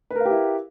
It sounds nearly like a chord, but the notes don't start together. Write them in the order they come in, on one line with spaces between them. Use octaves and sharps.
B4 A#4 F5 G4 E4